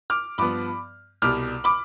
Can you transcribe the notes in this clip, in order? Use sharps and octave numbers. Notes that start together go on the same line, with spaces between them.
D6 F6
G2 F3 B3 B5 D6
C2 B2 G3 D6 F6
B5 D6